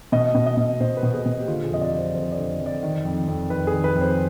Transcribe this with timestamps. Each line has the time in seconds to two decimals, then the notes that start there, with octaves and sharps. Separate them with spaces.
0.12 B2 D#5
0.35 B2
0.46 D#5
0.57 B2
0.80 B2 C5
0.97 B4
1.03 B2
1.14 G#4
1.26 B2
1.40 G4
1.48 D3 F4
1.64 G#4
1.70 F2 D#5
1.81 D5
1.93 F3
1.98 C5
2.15 F2 C5
2.32 D5
2.38 D3
2.60 F2
2.66 D5
2.83 D#3
3.05 F2
3.28 F2
3.50 D#3 B4
3.67 G#4
3.73 D#3
3.84 B4
3.95 F2
4.01 C5